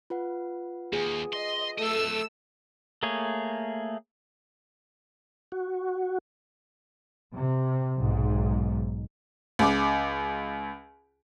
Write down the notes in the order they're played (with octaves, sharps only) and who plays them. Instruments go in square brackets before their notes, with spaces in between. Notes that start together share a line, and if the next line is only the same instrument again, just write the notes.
[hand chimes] F4 B4 F#5
[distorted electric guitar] D#2 [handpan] G#4
[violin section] D#5 [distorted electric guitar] C6
[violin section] A3 E6 [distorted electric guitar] A4 D#5
[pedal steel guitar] A3 A#3 G#4 C#5
[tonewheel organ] F#4
[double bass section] C3
B1 G#2
[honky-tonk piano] C#2 D6